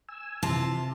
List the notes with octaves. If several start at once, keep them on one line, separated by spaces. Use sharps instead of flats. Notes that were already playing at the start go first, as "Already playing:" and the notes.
G#5 E6
C3 E3 F4 A5